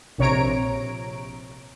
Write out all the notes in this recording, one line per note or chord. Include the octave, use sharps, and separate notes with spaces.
A#1 C3 C#5 A#5 D7